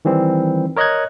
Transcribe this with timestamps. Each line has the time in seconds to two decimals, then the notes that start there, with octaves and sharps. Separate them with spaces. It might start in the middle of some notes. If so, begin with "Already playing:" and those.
0.05 D#3 E3 G3 C4
0.77 A#4 C#5 D#5 C#6 F#6 G#6